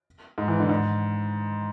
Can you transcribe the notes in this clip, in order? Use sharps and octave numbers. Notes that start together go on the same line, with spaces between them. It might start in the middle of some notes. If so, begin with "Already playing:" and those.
G#2
E3
D3
G#2